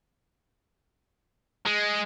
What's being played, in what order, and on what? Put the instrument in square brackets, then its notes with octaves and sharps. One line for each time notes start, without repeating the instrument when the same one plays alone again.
[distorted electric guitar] G#3